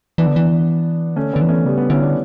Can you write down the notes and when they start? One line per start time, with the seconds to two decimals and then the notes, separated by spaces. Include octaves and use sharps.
0.18 E3 B3 D4
0.27 D3
0.36 E3
1.16 D3 A3 C#4
1.33 D3 B3 D4
1.41 E3
1.49 A3 C#4
1.65 C#3 G3 B3
1.78 B3 D4
1.90 D3 C#4 E4
2.02 B3 D4